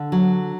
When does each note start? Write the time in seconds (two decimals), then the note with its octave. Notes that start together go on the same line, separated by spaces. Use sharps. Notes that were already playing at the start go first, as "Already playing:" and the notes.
Already playing: D3
0.12 F#3